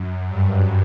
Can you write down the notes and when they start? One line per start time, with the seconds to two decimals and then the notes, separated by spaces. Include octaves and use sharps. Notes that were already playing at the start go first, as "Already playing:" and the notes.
Already playing: F#2
0.27 G2